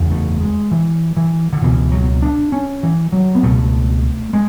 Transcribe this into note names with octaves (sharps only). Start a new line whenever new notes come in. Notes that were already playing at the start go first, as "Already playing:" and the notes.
Already playing: F#1 E2 C#3
A3
G#3
E3
E3
D3
C#2 B2 E3
F#3
D4
C#4
E3
F#3
B3
C#2 B2 A3
G#3